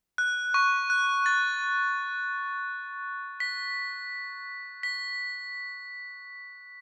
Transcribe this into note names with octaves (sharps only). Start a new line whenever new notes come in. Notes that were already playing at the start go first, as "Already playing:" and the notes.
F#6
C#6
F#6
A6
B6
B6